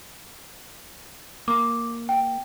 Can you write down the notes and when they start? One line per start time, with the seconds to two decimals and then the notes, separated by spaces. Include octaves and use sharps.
1.48 A#3 D6
2.09 G5